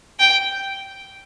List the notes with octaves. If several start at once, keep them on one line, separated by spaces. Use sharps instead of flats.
G5